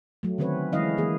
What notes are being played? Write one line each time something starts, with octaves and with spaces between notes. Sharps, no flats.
F#3 A3
D3 D#3 C4 C#4 B4 C#5
E3 G#3 C#4 E4 D#5 F5
E3 A#3 G#4